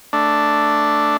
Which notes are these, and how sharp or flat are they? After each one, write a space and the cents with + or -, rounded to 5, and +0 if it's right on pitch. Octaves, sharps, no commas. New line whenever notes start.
A3 +0 D4 +0